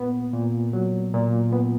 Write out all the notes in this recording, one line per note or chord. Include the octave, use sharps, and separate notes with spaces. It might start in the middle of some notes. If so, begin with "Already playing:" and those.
Already playing: A#2 B3
A#2
F#3
A#2
B3